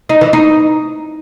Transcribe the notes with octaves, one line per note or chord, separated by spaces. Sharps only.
D#4
E3
D#4